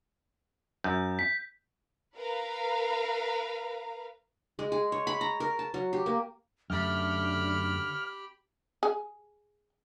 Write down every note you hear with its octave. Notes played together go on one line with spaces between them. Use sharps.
F#2 G6
B6
A#4 B4 F5 A#5
G#3
G#4
C#5
B5
A#5
A#4
A5
F#3
G4
A#3
F#2 D3 A3 G4 B5 F6
G#4